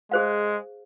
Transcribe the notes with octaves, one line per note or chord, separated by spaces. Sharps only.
G#3 G#4 C5 F5